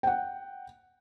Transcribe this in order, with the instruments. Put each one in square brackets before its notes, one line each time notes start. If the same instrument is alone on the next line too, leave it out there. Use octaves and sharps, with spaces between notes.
[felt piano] F#5 G5